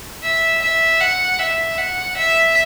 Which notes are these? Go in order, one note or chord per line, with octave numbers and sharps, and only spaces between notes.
E5
E5
F#5
E5
F#5
E5